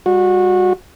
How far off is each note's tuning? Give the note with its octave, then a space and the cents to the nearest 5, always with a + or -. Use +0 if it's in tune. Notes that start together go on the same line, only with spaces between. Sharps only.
G3 +20 F#4 -20